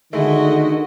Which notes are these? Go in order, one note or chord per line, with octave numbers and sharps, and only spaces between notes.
D3 D#3 G#3 A3 E4 F#4 D#5